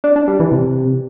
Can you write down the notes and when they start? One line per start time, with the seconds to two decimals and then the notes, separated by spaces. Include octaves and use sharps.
0.04 D4
0.16 D4
0.28 G3
0.40 E3
0.52 C3